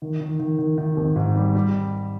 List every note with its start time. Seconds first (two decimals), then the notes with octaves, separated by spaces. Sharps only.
0.02 D#3
0.21 D#3
0.40 D#3
0.59 D#3
0.78 D#3
0.97 G#1
1.16 G#2
1.36 G3
1.55 G3